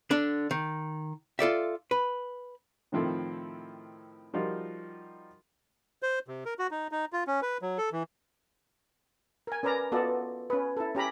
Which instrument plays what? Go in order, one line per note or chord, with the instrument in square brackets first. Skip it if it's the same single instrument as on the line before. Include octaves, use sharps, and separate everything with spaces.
[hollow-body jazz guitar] D3 D4
D#3
F4 A4 D5 E5
B4
[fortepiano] A2 D#3 F3 C4 E4 A4
F3 G3 D#4 F4 F#4 A#4
[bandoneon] C5
C3
A#4
F#4
D#4
D#4
F4
C#4
B4
F#3
A4
E3
[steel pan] A#4 G#5
C#4 A#4 B4 D5 A#5
B3 F4 F#4 A4 D5 D#5
C#4 B4
E4 A4
C#4 G4 A#5 B5